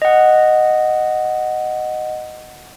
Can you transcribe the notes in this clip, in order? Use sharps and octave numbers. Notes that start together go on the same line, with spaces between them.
D#5 F#5